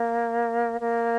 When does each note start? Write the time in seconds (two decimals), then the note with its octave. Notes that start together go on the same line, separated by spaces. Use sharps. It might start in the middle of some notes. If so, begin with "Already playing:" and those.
Already playing: A#3
0.80 A#3